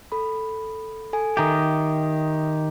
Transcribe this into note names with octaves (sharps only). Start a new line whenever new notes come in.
A4 B5
A4 G#5
D#3 G4 E5 A#5 D#6